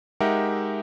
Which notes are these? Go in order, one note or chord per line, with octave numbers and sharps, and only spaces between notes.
G#3 D#4 G4 A#4 E5 F#5